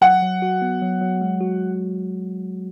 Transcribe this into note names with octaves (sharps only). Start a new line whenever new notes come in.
F#3 F#5
F#3
F#4
B3
F#3
F#3
G#3
F#4